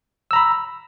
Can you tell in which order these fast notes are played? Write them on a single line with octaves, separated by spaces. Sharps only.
E6 A#5 B5